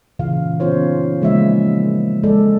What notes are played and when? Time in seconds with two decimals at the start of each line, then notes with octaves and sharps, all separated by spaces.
0.19 A#2 C#3 E3 F5
0.60 B3 C#4 D#4 F4 C5 C#5
1.22 C#3 F3 G#3 A#3 D#5 E5
2.23 G#3 A4 D5